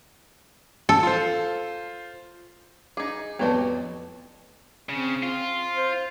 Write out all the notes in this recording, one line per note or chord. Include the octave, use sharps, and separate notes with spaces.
A4
F4 C5
D#4 G#4 D6 G#6
A1 F2 F#3 B3 F#4 B4 D5 A5
C#3 C4
F4
C5